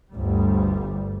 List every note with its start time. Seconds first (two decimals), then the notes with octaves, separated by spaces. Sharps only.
0.12 G1 D2 G3